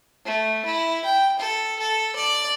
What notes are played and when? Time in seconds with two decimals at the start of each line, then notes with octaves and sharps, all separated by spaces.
0.25 A3
0.65 E4
1.04 G5
1.39 A4
1.79 A4
2.16 D5